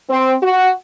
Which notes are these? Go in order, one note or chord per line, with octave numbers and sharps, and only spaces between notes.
C4
F#4